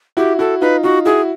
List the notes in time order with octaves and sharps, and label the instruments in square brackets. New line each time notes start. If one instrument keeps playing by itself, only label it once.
[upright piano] E4 F#4 [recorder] G4
[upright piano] E4 F#4 [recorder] A4
[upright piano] D#4 F4 [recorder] B4
[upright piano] D#4 F4 [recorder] F#4
[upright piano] E4 F#4 [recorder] G#4